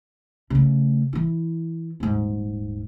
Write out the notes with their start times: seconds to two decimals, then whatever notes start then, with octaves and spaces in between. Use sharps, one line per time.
0.50 C#3 A3
1.13 E3 E4
2.00 D#1 G#2